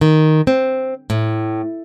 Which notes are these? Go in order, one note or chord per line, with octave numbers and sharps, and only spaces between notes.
D#3
C4
A2